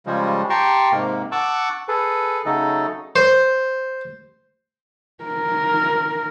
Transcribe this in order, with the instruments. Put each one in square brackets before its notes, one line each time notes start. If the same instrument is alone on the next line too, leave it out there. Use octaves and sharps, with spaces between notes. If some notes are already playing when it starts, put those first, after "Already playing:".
[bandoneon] C#3 F3 G3 G#3
G4 G5 A5 A#5 C6 C#6
G#2 C3 A#3
F#5 A5 C#6 D6 E6 F#6
G#4 A4 B4
C#3 F#3 A3 D#4 A4
[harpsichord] C5
[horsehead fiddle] A#4